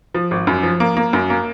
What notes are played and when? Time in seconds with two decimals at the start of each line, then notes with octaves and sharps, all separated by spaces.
0.14 F3
0.31 G#1
0.47 F#2
0.63 F3
0.80 A#3
0.97 A#3
1.13 F#2
1.30 A#3